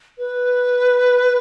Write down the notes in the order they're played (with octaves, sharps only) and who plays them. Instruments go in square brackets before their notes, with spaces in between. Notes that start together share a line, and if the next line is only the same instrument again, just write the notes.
[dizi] B4